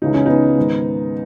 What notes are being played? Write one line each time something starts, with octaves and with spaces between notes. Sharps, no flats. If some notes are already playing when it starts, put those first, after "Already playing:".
C#2 C#3 E3 D#4
C#4
B3 D#4
G#2 D#3